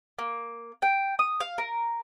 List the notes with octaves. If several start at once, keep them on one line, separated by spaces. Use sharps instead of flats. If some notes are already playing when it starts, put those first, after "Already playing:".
A#3
G5
D#6
F5
A#4